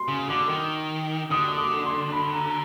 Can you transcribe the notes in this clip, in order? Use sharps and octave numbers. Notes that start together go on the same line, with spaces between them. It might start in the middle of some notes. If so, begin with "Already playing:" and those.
Already playing: C6
C#3
D3 D6
D#3
D3 D#6
D#6
D6
C6
B5
A#5